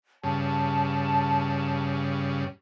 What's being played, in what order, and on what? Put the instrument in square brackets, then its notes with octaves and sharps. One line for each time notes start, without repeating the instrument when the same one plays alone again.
[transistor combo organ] G2 C#3 [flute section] A5